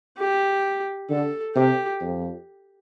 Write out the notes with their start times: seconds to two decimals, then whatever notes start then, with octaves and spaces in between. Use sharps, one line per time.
0.17 G4
1.10 D3 A4
1.56 C3 G4
2.01 F2